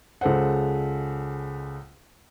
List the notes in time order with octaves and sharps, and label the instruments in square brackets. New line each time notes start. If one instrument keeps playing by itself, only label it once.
[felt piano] C#2 G#3 A4 C5 F#5